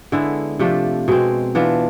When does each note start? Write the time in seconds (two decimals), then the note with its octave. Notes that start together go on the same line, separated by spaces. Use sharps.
0.12 D3 G#3 B3 E4
0.59 C3 F3 A3 D4
1.08 B2 G#3 C4
1.55 E3 B3 D4 F4